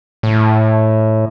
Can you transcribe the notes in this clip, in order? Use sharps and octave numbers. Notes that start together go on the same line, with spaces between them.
A2